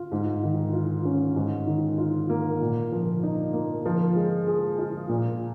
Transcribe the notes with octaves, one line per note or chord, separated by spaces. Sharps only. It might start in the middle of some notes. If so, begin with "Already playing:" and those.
Already playing: F4
G#2
D#3
F4
C#4
G#2
D#3
F4
A#3
A#2
F3
D#4
A#3
F3
G#3
G#4
F4
A#2